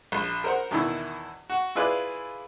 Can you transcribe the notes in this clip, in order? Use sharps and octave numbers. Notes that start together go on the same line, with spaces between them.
A#1
A#4 C5 F#5
E2 B2 D#3 E3 E4
F#4
E4 F4 G#4 B4 D5